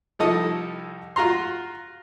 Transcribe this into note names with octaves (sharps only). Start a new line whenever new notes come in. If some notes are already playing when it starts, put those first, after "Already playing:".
C2 F3 D#4 A4 D#6
F4 F#4 A#5 C6